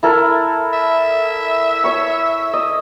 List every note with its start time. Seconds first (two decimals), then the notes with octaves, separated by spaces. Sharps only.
0.03 E4 A4 A#4
0.73 E5
1.84 C#5 C#6
2.53 D#5